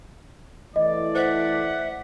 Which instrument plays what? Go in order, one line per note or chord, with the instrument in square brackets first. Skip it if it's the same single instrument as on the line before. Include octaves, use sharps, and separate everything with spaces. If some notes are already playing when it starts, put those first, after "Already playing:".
[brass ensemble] E3 A3 D5 [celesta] D#5
[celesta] C5 [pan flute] E5 [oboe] F#5